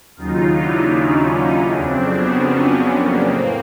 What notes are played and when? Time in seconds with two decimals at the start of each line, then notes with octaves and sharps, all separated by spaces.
0.16 D#2 C#3 F#3 D#4 F4
0.56 D4 E4
0.94 C#4 D#4
1.73 F2 C#3 F#3 C4 D4
2.12 B3 C#4
2.90 A#3 C4
3.30 A2